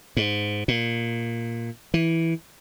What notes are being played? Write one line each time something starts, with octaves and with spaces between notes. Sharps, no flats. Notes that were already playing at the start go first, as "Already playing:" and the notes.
G#2
A#2
E3